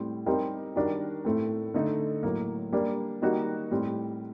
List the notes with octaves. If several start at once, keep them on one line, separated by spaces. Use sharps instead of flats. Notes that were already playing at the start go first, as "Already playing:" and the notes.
Already playing: A2 G3 C4
G3 C4 D#4 G4 A#4
D#3 G3 D4 F#4 A#4
A2 A3 C4
D3 A3 D#4
A2 F#3 A#3
G3 A#3 D4
D#3 G3 A#3 D#4 F#4
A2 G3 C4